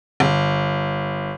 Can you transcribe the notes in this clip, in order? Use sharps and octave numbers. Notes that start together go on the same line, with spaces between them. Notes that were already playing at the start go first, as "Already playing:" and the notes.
G1